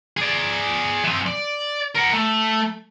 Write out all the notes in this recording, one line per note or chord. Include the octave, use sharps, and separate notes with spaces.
G#4 D5
E3 C4
D5
A#4 F#5
A3